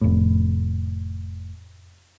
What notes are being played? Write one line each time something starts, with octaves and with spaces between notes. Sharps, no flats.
F1 A2